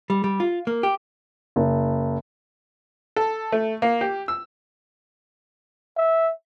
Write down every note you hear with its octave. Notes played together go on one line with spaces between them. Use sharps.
G3
G3
F4
A#3
G4
F#1
A4
A3
A#3
G4
E6
E5